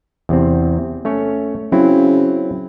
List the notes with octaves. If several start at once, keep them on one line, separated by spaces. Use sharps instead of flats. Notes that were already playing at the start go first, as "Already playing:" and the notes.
E2 C3 C4
A3 C#4 C#5
C#3 F#3 C4 E4